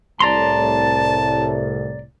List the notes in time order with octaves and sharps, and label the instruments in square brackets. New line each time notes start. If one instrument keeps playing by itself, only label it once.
[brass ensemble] C2 A2 [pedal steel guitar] D5 A#5 C6 [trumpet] A5